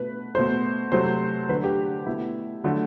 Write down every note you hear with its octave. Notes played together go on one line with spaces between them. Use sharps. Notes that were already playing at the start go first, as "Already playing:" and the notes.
Already playing: B2 A3 B4
B2 A3 C5
C3 F#3 A3 C5
D3 F#3 A3 B4
G4
B2 A3 E4
D3 F#3 A3